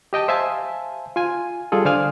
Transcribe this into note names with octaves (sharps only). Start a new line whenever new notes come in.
G4 D#5 G5 A5
C5 E5 F5 G#5 A5
F4 G#5
G3 F4 G#4 A4
D3 C5 D5 F5 G#5 F6